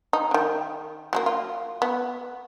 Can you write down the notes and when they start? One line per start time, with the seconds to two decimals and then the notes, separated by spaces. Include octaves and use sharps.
0.13 D#4
0.31 D3 D#3
1.13 F#3 G#3 A#3
1.26 F4
1.82 B3